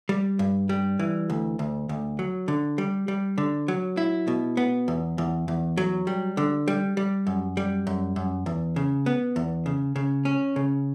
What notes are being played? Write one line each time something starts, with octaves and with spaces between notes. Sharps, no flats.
G3
G2
G3
E3
D2
D2
D2
F#3
D3
G3
G3
D3
F#3
E4
B2
B3
E2
E2
E2
F#3
G3
D3
G3
G3
F#2
G3
F#2
F#2
E2
C#3
B3
E2
C#3
C#3
C#4
C#3